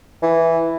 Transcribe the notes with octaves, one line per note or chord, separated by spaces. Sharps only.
E3